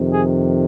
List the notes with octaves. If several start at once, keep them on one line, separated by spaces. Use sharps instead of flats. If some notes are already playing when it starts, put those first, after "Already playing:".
Already playing: F2 C3 D#3
G#4